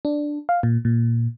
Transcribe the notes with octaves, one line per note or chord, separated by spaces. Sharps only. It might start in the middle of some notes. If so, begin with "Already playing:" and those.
D4
F5
A#2
A#2